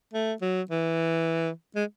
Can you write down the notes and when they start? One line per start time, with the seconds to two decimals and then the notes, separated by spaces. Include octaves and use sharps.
0.14 A3
0.42 F#3
0.71 E3
1.75 G#3